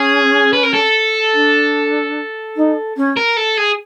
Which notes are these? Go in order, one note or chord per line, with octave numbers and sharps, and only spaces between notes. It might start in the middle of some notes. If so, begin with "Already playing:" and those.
Already playing: C#4 G#4
B4
A#4
A4
D4
D#4
C#4
A#4
A4
G#4